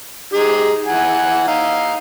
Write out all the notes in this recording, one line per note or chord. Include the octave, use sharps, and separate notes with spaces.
D#4 G4 G#4
E3 F#5 G#5
D#4 F5